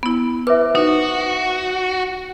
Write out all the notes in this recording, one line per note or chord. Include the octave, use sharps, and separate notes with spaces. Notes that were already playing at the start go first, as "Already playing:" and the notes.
B3 E4
B4 C5 E5 D6
D#4 F#4